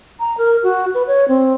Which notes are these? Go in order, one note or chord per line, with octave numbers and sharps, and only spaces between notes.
A#5
A#4
F#4
B4
C#5
C4